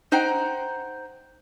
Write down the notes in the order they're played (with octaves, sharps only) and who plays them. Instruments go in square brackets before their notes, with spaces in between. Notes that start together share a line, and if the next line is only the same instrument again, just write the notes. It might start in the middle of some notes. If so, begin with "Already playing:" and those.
[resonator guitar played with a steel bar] D#4 C5 F#5 G5 A#5